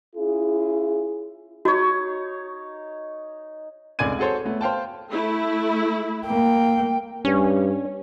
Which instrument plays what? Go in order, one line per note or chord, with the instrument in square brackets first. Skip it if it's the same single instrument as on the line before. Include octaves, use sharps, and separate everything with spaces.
[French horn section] C#4 E4 F4 G#4
[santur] D#4 C#5 [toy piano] F#4
[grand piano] F1 C#2 D5 G#5 G#6 D#7
F#4 G#4 A4 C5 C#5
A3 B3
C5 F5 G5 A5
[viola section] A3 E4
[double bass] A#3 [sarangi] G5
[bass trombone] G2 [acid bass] C#4